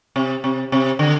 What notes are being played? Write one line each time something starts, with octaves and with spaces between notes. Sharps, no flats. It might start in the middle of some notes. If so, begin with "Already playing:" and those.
C3
C3
C3
D3